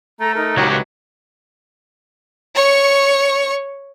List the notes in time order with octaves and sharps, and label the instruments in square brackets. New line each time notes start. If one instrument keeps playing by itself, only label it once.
[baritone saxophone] A3 [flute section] A4 A#5
[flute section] D#4 A#4
[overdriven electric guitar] C#2 G4 [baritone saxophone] F#3
[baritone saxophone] F#3 [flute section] B4
[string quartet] C#5 C#6